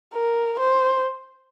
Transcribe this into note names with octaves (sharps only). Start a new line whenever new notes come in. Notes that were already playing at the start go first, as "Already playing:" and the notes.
A#4
C5